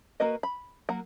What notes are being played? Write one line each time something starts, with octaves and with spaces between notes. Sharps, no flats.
A#3 F#4 A#4 B4 D#5
B5
F#3 A#3 F#5 A#5